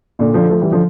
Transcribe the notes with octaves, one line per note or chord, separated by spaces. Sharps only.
A#2 D3
D3 F3
F3 A3
E3 G3
D3 F3